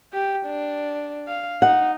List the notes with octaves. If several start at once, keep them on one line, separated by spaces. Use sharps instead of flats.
G4
D4
F5
D#4 F#5